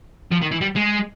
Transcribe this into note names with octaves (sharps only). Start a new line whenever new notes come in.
F3
D#3
E3
G3
G#3